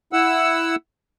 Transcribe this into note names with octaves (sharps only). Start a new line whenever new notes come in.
E4 F#5 E6